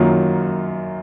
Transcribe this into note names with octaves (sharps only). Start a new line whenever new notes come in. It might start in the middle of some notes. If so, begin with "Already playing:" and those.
Already playing: F#2 D#3 F#3 A#3 F4